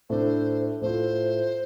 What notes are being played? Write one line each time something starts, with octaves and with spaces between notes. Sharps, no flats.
A2 A3 D4 C5
A2 A3 F4 C5